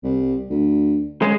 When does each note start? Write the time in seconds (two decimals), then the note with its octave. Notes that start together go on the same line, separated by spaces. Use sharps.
0.04 C2
0.50 D2
1.22 C#3 G#3